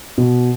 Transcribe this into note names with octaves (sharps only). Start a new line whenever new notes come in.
B2